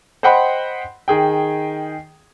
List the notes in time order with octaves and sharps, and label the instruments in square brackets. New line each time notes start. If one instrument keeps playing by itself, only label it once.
[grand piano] C5 D#5 F#5 G5 B5 C6
D#3 G#4 G5